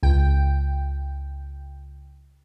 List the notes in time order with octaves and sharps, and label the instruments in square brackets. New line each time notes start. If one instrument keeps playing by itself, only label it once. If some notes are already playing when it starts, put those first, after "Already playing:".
[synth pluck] C#2 G5